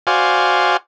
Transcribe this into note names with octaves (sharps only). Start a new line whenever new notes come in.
F#4 C5 D5 F5 G#5